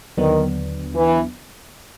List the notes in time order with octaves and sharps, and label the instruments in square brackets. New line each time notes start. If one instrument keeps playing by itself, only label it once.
[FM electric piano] D#2 D3 F#3 B3 D4 [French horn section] D#3
[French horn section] E3